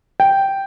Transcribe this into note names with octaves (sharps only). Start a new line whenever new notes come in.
G5